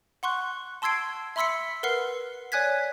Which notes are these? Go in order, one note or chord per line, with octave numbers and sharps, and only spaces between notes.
F#5 C6 C#6 F#6
A5 C6 E6 G#6 C7 D7
E5 B5 C6 E6 B6 C#7
A#4 B4 F#5 F6 C7
C#5 D5 G#5 F#6 G#6 B6